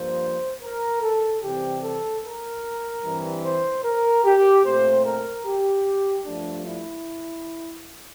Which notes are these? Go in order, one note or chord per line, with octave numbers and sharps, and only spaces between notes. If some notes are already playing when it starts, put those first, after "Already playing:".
Already playing: G2 F3 A#3 C5
A#4
A4
C3 E3 G3 C4 G4
A4
A#4
G2 E3 G3 C4
C5
A#4
G4
A#2 A3 C4 C5
A#4
G4
G2 F3 A3 D4
E4